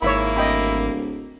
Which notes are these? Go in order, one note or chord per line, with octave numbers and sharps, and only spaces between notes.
G#1 G#2 A#3 E4 C#5 E5 B5
D1 D#5 G5 B5